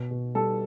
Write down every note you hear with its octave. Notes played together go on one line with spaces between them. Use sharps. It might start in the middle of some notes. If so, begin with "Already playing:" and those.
Already playing: B2
B2
G3 A4